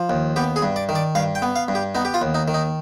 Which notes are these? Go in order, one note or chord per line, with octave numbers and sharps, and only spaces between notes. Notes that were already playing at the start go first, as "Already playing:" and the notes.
Already playing: F3
D#2
B3 G4
G#4
G2
D5
D#3
D5
G2 F5
G5
B3
F5
G2
G4
B3 D#4
G4
F4
D#2
D#4
D#3
D#4